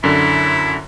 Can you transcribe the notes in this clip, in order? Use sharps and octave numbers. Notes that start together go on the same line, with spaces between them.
F#2 D3 E4